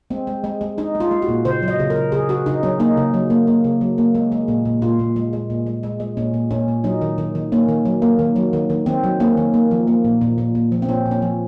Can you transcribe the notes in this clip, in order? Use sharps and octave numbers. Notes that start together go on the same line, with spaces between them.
G#3 C4
G#3
G#3
G#3
G#3 D#4
G#3
F4
G#3
F#4
A#2
C#3 C5
F#3
D#5
C#3
A#4
C#3
C#3 G#4
C#3 F#4
C#3 D#4
F#3 C#4
A#3 D#4
C#3
F#3
A#3
A#3
C#3
F#3
A#3
G#3
G#3
A#2
A#2
A#2 F4
A#2
G#3
G#3
A#2
G#3
G#3
G#3
A#2 C#4
A#2
A#2 C#4
A#2
F#3 D#4
D#3
D#3
D#3
A#3 C#4
D#3
F#3
A#3
D#3
F#3
D#3
D#3
D#3 C4
F#3
A#3 C#4
D#3
A#3
F3
A#3
A#2
A#2
A#2
A#2
F3
C4
A#2 C#4
A#2
C#4
F3